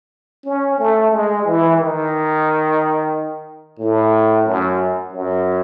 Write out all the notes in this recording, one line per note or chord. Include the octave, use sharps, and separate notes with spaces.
C#4
A3
G#3
E3
D#3
A2
F#2
F#2